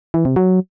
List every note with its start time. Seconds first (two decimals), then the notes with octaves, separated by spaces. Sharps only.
0.14 E3
0.25 C3
0.36 F#3